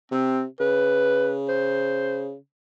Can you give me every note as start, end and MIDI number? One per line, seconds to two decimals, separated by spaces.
0.11 0.46 48
0.11 0.43 60
0.60 2.35 49
0.60 1.35 71
1.48 2.28 72